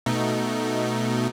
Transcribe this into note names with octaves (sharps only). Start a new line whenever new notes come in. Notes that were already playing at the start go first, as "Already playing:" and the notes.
B2 A3 D#4